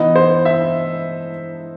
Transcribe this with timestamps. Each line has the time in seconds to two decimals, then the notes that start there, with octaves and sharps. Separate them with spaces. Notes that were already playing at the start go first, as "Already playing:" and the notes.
Already playing: E3 B3 D#4 D#5
0.16 C5
0.45 E5